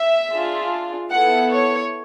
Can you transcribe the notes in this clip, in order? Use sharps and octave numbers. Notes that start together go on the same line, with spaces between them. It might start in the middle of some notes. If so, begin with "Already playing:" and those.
Already playing: E5
D4 F4 G#4
B3 E4 A4 F#5
C#5